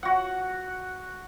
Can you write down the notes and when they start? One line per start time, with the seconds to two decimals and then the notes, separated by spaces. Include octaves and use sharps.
0.03 F#4 F#5